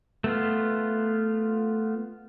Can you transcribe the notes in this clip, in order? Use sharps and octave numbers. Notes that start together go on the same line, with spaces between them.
A3 B3 F4